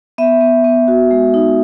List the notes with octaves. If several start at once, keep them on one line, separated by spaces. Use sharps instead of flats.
B3 E5
B3
B3
F#4
G#3
D#4